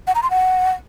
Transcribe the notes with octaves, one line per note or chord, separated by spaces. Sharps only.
F#5
A#5
C6
F#5